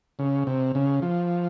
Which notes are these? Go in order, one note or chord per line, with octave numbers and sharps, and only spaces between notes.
C#3
C3
C#3
F3